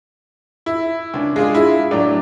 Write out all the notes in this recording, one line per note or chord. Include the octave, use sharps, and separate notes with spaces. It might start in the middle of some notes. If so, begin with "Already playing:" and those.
E4
C#2 D4
G#3 D4 F4 G#4
E4
A2 F#3 D4